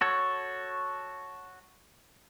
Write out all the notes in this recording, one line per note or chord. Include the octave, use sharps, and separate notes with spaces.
F#4 A4 C#5